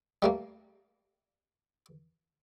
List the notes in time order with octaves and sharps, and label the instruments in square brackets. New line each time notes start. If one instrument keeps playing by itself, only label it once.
[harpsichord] G3 A3 A#3